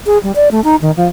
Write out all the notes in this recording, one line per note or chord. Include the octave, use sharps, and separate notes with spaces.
G#4
G3
D5
A3
D#4
D#3
F3